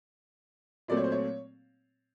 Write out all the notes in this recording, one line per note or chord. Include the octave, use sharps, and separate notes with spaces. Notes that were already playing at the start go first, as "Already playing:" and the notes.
A#2 F#3 A3 C4 D5
C#5
C5
C#5